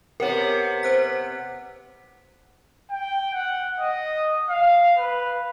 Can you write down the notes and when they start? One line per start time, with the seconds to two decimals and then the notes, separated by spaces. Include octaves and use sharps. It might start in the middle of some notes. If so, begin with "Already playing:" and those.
0.20 C3 B3 A#4 C#5
0.83 C5 F#6 B6
2.91 G5
3.34 F#5
3.80 D#5
4.50 F5
4.98 B4